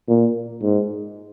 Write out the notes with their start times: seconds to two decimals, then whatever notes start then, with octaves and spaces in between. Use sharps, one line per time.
0.08 A#2
0.62 G#2